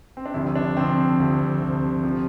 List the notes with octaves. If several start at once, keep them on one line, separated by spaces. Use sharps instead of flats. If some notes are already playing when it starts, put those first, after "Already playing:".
C4
D4
D2 C3 F3 E4
D4
D2 C3 F3 C4
D2 C3 F3
D2 C3 F3
C3 F3